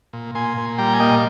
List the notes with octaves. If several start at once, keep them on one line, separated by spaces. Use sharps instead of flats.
A#2
A#2 G#5 C6
A#2
G3 G5 A#5
G#5
A#3 D#5 G5